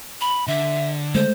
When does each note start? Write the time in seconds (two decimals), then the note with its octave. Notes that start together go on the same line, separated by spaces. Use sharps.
0.21 B5
0.48 D3 E5
1.15 G#3 A3 C5